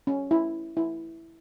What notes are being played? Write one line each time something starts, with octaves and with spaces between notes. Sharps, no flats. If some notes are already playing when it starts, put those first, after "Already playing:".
C#4
E4
E4